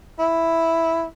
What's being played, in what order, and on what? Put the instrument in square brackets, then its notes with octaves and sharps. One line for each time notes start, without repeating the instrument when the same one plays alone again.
[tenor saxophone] E4